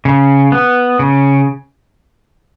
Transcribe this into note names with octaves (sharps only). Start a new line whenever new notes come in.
C#3
B3
C#3